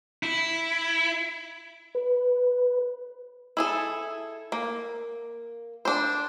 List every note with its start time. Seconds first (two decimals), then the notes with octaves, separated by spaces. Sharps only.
0.23 E4
1.95 B4
3.57 E4 G#4 A4
4.52 A#3
5.85 D4 C5